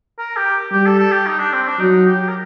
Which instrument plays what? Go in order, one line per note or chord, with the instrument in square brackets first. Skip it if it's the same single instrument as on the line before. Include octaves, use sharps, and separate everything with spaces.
[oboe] A#4
G4
[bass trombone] G3 [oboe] G4
[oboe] A4
A4
G4
D#4
D4
C4
D4
[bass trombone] F#3 [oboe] D#4
[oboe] G4
A#4